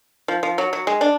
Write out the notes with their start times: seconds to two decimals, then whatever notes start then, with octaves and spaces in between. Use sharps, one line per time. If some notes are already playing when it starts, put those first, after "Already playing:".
0.28 F3
0.43 F3
0.58 F#3
0.73 F#3
0.87 G#3
1.01 D4